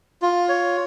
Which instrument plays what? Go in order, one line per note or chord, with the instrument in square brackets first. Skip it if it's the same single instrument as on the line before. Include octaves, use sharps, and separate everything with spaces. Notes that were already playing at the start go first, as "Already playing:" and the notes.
[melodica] F4
C#5